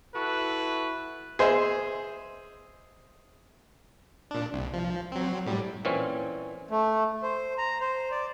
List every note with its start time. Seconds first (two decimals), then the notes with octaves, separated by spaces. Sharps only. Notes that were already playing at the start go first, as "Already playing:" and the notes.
0.15 E4 F#4 A4 B4
1.39 G#4 C5 D#5 E5
4.31 A#2 D4
4.54 C2
4.73 F3
5.12 F#3 C4
5.46 A2 G3
5.85 A#2 E3 C4 C#4
6.71 A3
7.23 C5
7.58 A#5
7.81 C5
8.11 D5